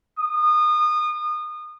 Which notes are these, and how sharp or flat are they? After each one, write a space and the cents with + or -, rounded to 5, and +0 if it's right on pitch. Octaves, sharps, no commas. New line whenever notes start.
D#6 -30